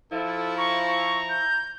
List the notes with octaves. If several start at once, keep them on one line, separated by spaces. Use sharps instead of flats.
F3 E4 A4
A#5 C#6
C#6
G6